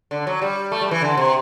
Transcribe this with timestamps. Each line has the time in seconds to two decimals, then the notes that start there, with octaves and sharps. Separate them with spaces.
0.11 D3
0.27 F#3
0.41 G3
0.72 A3
0.81 G3
0.91 E3
1.02 D3
1.17 C3